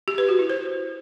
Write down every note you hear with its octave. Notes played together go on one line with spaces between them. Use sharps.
G4
B4
F#4
E4
C5